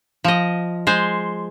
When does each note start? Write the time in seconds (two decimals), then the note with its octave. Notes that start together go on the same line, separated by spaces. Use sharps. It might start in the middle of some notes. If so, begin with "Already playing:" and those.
0.24 F3 D#5
0.87 G#3 C5